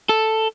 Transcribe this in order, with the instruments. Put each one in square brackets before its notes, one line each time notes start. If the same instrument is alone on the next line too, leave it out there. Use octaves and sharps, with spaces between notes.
[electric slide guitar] A4